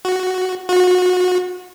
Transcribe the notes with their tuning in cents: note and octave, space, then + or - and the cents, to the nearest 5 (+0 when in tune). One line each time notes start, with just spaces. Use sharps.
F#4 +0
F#4 -30